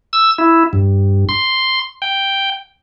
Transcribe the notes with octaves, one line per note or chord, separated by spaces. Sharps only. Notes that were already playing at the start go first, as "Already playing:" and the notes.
E6
E4
G2
C6
G5